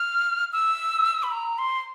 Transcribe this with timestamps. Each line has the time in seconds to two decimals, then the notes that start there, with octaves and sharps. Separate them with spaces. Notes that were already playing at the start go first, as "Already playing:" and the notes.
Already playing: F6
0.53 E6
1.23 B5
1.32 A#5
1.58 C6